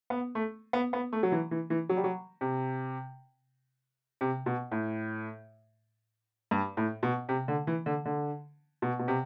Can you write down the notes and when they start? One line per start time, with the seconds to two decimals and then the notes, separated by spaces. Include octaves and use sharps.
0.10 B3
0.35 A3
0.73 B3
0.93 B3
1.13 A3
1.23 F#3
1.32 E3
1.51 E3
1.70 E3
1.89 F#3
1.97 G3
2.04 F#3
2.41 C3
4.21 C3
4.46 B2
4.72 A2
6.51 G2
6.77 A2
7.03 B2
7.29 C3
7.48 D3
7.67 E3
7.86 D3
8.06 D3
8.82 B2
8.99 B2
9.08 C3